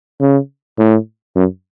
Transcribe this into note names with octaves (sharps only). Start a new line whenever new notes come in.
C#3
A2
F#2